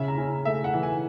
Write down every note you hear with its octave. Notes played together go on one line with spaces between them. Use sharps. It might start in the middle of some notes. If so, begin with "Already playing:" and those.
Already playing: C#3 E5
A#5
C#4
A3 E5
F#5
E3
G#5